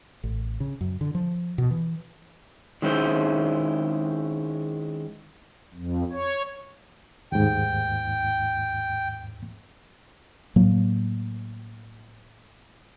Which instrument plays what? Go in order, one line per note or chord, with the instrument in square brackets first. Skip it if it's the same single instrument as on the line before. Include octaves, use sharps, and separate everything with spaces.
[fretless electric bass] A1
C#3
F#2
D3
F3
B2
E3
[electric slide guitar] D#3 G#3 C#4 E4 C5
[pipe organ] F2
C#5
[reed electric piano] D#2 G#2 [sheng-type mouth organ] G5
[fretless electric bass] A2 F#3 A#3